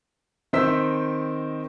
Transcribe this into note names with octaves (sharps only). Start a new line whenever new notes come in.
D#3 C4 D#4 C5 E6 B6